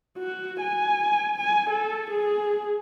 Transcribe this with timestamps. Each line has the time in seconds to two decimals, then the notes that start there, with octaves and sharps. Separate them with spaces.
0.18 F#4
0.60 G#5
1.37 G#5
1.70 A4
2.10 G#4